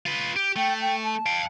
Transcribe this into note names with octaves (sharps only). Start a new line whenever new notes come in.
F4 B4
G4
A3 G5
G5
A5
F5 G5